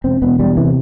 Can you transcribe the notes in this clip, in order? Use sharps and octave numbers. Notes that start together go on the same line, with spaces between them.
E1 C4
E1 B3
E2 G3
C3 E3